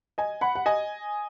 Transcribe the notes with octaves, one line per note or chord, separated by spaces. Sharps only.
D#5 G#5
F#5 B5
F#5
D#5 G#5